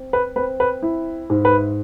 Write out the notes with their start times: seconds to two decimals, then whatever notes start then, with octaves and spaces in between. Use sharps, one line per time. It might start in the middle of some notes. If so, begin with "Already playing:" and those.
Already playing: C4
0.13 B4
0.36 C4 B4
0.60 B4
0.82 E4
1.30 G#2
1.45 B4